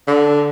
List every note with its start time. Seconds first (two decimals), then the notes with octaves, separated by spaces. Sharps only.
0.08 D3